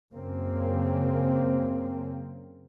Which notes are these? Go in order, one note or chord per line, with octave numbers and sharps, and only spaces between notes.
F#2 C#3 A#3 C4